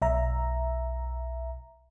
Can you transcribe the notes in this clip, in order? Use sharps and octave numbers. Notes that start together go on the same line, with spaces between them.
B1 E5 A#5